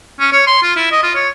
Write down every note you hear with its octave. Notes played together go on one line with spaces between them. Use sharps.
C#4
C#5
C6
F4
E4
D#5
F4
C#5